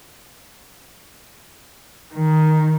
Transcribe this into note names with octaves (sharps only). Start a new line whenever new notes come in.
D#3